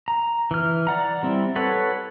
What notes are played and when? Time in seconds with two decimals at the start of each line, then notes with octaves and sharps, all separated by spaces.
0.08 A#5
0.51 E3 F6
0.87 D5 F#5 A#5
1.23 G3 C4 E4
1.56 A4 B4 C#5 F#5